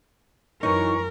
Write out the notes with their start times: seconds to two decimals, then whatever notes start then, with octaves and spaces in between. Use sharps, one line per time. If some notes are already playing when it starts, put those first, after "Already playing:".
0.63 F#2 E3 F#3 D#4 A#4 C#6